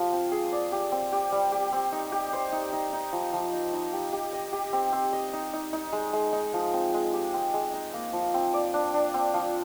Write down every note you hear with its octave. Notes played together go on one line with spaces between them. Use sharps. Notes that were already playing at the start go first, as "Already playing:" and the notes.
Already playing: F3 F4 G4
C4
G#4
D5
G4
C4
G4
G3
G4
C4
D#4
G4
C5
D#4
D#4
D#4
F3
F3
D#4
D#4
G4
G4
D#5
G4
C4
C4
D#5
D#4
D#4
D#4
G#3
G#3
D#4
F3
C4
G#3
G4
C4
G#3
D#4
A#3
F3
C4
D5
D4
D4
C4
F3